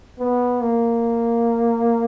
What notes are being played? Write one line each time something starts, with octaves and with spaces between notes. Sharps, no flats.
B3
A#3